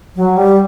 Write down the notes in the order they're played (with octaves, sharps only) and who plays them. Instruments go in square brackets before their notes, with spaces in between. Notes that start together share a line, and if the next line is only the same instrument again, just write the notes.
[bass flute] F#3
G3